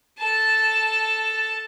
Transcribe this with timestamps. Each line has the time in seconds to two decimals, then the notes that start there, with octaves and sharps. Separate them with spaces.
0.18 A4 A5